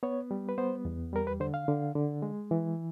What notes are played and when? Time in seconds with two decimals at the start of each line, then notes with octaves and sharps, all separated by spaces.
0.03 B3 C#5
0.31 G3
0.49 B4
0.58 B3 C5
0.85 E2
1.13 G3 A#4
1.27 B4
1.40 D3 C5
1.54 F5
1.68 D3
1.96 D3
2.22 G#3
2.51 E3